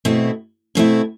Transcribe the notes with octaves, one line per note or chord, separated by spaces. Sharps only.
B2 A3 C4 E4
B2 A3 C4 E4